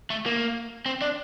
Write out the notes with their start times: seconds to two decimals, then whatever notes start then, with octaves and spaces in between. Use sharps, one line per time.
0.10 A3
0.26 A#3
0.86 C4
1.01 D4